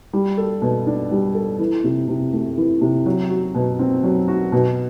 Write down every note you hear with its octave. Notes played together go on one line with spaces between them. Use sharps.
G3
A4
B2
D4
G3
A4
E3
C3
C3
A3
E3
C3
F#3
F#4
B2
C4
F#3
F#4
B2